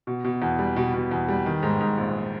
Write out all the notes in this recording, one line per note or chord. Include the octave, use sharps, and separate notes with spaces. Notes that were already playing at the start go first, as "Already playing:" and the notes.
B2
B2
E2
G3
B2
B2
E2
G3
D#3
G#2
G#2
A#1